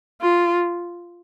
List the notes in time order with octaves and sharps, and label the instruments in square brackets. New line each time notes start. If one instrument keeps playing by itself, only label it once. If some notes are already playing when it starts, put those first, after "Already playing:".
[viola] F4